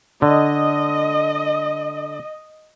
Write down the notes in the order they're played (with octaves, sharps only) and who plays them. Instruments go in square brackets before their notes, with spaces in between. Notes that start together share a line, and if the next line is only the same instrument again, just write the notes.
[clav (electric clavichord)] D3 [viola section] D#5